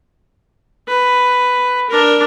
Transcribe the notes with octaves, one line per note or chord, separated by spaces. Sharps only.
B4
D4 A#4